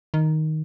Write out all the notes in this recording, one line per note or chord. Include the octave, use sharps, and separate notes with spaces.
D#3